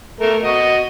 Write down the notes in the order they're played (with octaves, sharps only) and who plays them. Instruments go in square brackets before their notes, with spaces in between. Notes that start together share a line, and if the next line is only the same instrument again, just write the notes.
[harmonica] A3 A#4
F#4 D#5